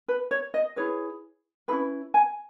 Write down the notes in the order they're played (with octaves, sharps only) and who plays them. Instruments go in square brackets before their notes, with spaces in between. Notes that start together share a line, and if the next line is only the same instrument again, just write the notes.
[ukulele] B4
C#5
D#5
E4 G#4 B4 C#5
C#4 E4 G#4 B4 B5
G#5